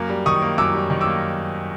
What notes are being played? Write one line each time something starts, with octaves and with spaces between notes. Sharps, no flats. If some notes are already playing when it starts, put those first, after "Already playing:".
Already playing: F#2 A#3
G3
D#3 C#6 D#6
A#3
F#2 D6 E6
G3
D#3
D6 E6
A#3